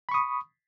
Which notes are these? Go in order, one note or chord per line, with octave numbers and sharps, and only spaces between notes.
B5 C#6 D#6